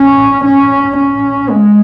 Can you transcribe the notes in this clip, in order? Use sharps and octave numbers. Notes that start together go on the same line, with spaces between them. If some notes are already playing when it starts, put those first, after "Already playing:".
Already playing: C#4
C#4
C#4
G#3